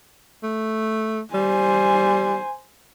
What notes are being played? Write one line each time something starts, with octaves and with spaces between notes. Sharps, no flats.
A3
G3 C5 G#5